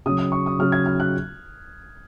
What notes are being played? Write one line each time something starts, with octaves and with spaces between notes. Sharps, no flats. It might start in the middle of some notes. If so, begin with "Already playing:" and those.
C#3 F#3 D#6
D#6
C#6
D#6
C#3 F#3 F6
G#6
F6
F#6